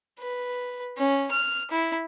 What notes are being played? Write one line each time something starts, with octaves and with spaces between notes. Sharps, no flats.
B4
C#4
F6
E4